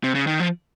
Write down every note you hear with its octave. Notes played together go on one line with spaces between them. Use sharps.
C3
C#3
D#3
F3